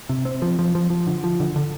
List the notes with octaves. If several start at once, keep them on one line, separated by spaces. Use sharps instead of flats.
C3
C4
F3
F3
F3
F3
D3
F3
D3
D3